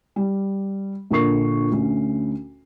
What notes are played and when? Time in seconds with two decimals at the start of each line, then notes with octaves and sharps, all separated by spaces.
0.16 G3
1.11 A#1 A#2 D3 A#4 C#6 C7
1.71 D2 C#4